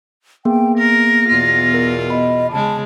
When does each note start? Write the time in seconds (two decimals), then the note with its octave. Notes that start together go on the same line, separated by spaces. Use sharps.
0.45 A#3 B3 G#4 G5
0.78 A#4 A#6
1.29 E2 B2 F4
1.74 A#4
2.10 D#5 B5
2.52 C#3 G#3 A5